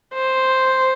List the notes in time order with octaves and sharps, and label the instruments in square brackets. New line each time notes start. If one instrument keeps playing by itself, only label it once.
[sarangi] C5